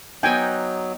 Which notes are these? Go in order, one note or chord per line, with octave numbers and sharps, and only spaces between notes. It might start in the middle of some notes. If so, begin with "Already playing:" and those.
F#3 B3 D#4 G5 G#5